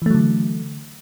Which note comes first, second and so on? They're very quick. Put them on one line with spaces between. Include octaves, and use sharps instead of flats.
E3 A3 F#3 D3